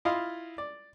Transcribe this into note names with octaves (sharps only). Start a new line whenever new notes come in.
E4 F4 D#5 F5 C6
D5